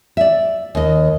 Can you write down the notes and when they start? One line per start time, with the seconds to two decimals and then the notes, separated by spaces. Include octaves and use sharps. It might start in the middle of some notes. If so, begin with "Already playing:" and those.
0.17 D5 E5
0.75 D#2 D#5